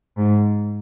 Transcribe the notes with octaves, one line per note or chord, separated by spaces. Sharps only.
G#2